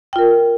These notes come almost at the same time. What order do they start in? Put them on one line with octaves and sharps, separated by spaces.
G5 F4 A#4